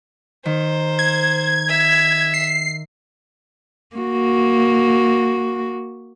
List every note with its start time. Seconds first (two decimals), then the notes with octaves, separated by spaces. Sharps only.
0.46 D#3 C5
0.99 G#6
1.69 E5
2.34 C7
3.96 A#3 F#4